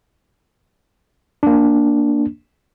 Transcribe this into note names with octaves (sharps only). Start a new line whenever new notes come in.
A#3 D4